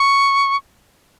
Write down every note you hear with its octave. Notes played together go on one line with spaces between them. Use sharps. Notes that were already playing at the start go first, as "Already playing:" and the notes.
Already playing: C#6